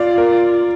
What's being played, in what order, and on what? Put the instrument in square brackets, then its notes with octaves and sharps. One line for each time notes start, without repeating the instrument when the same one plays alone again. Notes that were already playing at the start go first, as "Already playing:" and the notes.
Already playing: [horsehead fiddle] F4 [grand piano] D5 F5
[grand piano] A#4